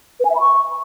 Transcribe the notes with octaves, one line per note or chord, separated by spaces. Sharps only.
B4
G#5
E5
B5
C#6